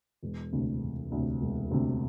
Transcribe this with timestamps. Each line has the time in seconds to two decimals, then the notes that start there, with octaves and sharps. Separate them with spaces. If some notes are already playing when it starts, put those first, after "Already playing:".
0.23 E1
0.52 D2 C3
0.82 E1
1.12 D2 C3
1.41 E1
1.71 D2 C3